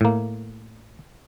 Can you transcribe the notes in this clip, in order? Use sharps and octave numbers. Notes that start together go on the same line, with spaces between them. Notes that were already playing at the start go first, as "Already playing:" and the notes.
A2 A#3